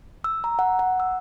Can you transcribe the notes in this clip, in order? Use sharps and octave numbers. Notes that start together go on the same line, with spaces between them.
E6
A#5
F#5
F#5
E6